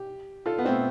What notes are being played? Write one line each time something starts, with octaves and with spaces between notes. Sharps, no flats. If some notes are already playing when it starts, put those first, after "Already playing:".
Already playing: G4
F4 A4
B3
A3 C4